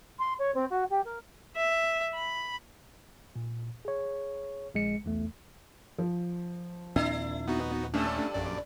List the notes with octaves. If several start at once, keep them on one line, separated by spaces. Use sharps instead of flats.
C6
C#5
C4
F#4
G4
A#4
E5
B5
A#2
G#4 C#5
A#1 G#3 C#7
B1 E2 A3
F3
D#2 A#2 C4 D4 E4
B3 D#4 F#4
G2 A3 C#4 D4 A4
A#1 F#2 D5